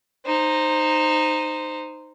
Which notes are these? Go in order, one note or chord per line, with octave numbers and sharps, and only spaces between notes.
D#4 C5